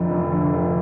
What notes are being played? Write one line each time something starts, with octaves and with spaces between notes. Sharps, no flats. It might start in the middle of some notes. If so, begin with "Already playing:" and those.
Already playing: F1 F2 D3
F1
D3
F1